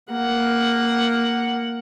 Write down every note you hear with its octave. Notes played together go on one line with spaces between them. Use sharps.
A#3 F#5